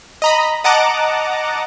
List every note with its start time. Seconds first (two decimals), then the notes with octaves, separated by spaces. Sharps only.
0.22 D#5 A#5 B5
0.64 D#5 F#5 A5 A#5 D6